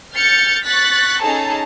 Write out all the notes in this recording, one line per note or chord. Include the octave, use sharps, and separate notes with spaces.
F6 G6 A6 C#7
C#6 F#6 A6 B6
C#4 D#4 G#4 A4 A5 A#5